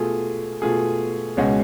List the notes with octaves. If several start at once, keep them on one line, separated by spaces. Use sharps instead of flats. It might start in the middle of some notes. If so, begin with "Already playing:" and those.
Already playing: B2 A3 F4 G#4
B2 A3 F4 G#4
C#2 B2 G#3 C#4 F#4